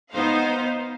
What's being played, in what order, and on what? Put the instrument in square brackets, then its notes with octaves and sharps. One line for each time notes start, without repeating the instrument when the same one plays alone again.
[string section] B3 D#4 C5 F5